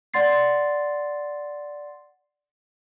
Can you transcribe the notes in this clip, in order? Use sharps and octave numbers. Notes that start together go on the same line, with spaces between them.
D5 F#5 C6 A6 C7